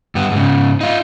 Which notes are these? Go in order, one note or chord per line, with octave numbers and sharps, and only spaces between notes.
G2 B3
G#2 C#3
D#4 F4